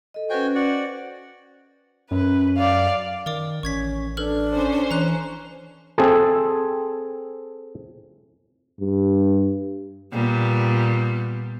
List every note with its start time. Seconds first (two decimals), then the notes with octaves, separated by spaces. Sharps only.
0.14 A4 D#5
0.30 C#4 F#4 B4 C5 G5 G#5
0.55 F#4 D5 F#5
2.11 F#2 B4
2.58 D5 F5
3.26 D#3 A#4 D5 D6
3.63 A1 C#4 C#6 G#6 B6
4.17 D4 A4 B4 F6
4.52 C#4 C5
4.91 E3 A#5 F#6
5.98 C4 G#4 A4
8.81 G2
10.12 A#2 G3 B3